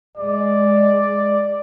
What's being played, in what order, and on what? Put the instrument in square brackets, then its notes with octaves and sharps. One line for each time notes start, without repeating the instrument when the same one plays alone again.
[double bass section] G#3 [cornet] D5